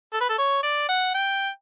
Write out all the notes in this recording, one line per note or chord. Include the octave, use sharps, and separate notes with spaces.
A4
B4
A4
C#5
D5
F#5
G5